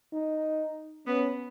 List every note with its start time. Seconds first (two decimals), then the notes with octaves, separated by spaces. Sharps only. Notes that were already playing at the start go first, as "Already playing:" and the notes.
0.13 D#4
1.07 B3 C#4